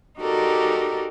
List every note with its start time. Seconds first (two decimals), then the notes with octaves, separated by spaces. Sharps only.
0.19 D#4 F#4 G4 A4 A#4 D5